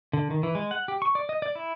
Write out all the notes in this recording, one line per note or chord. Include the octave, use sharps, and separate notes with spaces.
D3
D#3
E3
G#3
F#5
G4
C#6
D5
D#5
D5
E4